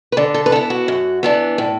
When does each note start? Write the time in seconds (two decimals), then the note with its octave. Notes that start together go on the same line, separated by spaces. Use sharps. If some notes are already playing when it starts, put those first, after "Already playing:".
0.12 B4
0.17 D3 D5
0.34 A4
0.46 B4
0.52 B3 A4
0.56 E4
0.70 F#4
0.88 F#2
1.23 E3 B3 D4
1.58 A2